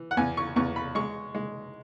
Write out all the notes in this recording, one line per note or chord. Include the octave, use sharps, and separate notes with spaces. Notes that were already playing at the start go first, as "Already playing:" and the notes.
Already playing: E3
F#5
E2 G#5
C#6
E2 C#6
B5
G#3 C#6
G#3